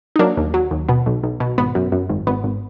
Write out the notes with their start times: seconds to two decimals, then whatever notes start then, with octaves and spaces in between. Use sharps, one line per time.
0.16 D#4
0.19 F#3 A#3 D4
0.37 D#2
0.54 F#3
0.71 D#2
0.89 B2 B3
1.06 B1
1.23 B1
1.40 B2
1.58 G#1 B3
1.75 F#2
1.92 F#2
2.09 G#1
2.27 G#1 B3
2.44 G#1